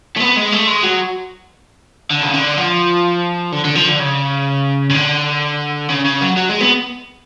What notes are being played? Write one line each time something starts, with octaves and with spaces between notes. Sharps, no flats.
A3
B3
G#3
A3
G#3
F#3
D3
C#3
D3
F3
D3
D3
F3
D3
C#3
C#3
D3
C#3
C#3
F#3
F#3
G#3
B3